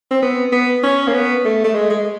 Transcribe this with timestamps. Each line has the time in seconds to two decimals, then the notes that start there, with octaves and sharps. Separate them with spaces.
0.11 C4
0.22 B3
0.52 B3
0.83 C#4
1.08 A#3
1.13 B3
1.45 A3
1.64 A3
1.75 G#3
1.90 G#3